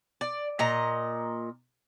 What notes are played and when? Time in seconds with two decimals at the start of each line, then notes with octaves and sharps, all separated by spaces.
0.21 D5
0.59 A#2 D#5 A#5